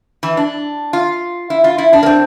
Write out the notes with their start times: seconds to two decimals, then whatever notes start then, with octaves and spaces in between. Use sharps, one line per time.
0.23 E3
0.37 D4
0.93 F4
1.50 E4
1.64 F4
1.78 E4
1.93 D4
2.03 A#3
2.06 C4